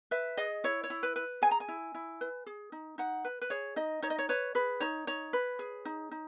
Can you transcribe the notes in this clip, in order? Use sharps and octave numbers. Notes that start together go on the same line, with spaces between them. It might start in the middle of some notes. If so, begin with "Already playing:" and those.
B4 E5
G#4 D#5
E4 C#5
C#5
E4
B4
B4
G#4 G#5
A#5
G#5
E4
E4
B4
G#4
D#4
D#4 F#5
B4
B4
G#4 C#5
D#4 D#5
D#4 C#5
D#5
C#5
B4 C#5
G#4 B4
D#4 C#5
D#4 C#5
B4
G#4
D#4
D#4